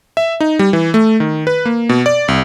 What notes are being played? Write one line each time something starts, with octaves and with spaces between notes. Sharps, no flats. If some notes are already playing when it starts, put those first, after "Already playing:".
E5
D#4
G3
E3
A3
D#3
B4
A#3
B2
D5
C2